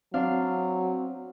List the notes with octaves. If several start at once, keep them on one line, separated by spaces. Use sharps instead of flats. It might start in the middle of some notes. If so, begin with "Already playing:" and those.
F#3 C4 D4 F5